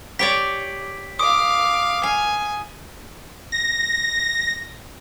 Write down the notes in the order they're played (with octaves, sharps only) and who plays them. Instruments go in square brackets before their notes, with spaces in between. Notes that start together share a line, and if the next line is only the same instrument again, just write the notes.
[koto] G4 C#5 D5 [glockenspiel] B6
[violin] F5 D6 [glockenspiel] D#6
[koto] F5 [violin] G#5
[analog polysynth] A#6